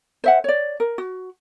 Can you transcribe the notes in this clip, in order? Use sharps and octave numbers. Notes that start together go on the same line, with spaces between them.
C5 E5 F#5
C#5 D5
A#4
F#4